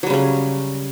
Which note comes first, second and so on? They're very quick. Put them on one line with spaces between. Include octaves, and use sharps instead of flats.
F#3 G3 C#3 C#4